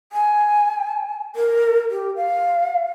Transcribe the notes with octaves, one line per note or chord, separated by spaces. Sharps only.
G#5
A#4
G4
F5